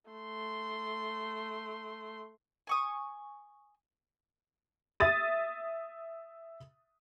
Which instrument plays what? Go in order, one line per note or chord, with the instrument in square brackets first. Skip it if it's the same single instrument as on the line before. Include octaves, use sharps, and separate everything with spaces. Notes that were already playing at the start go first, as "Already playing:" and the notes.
[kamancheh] A3 C6
[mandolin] G#5 C#6 D#6
[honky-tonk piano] E5 D#6 A6 D#7